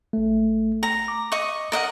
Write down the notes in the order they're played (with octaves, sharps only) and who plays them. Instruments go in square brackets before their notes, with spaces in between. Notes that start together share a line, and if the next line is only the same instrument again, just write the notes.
[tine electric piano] G#1 A3
[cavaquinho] A#5
[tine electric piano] D6
[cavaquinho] D#5 C#6
A#4 D#5 F#5